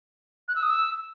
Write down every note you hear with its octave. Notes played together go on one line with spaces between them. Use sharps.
F#6
E6
D#6
E6